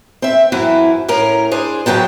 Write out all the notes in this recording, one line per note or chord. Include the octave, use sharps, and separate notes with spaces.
C4 E5
F#2 E3 C4 E4
A2 C#4 A#4
D4 G#4 C5
F#2 C#3 F#3 G5 A5